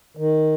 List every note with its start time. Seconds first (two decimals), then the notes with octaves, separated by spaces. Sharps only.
0.17 D#3